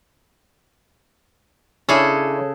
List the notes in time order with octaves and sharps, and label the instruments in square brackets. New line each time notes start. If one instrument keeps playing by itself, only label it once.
[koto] C#3 G#4 A4 [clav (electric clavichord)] C#4 D4 E4